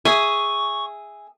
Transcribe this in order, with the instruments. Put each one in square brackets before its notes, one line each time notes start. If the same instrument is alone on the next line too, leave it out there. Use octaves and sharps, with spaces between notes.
[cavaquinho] G#4 E5 [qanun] G#5 [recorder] C#6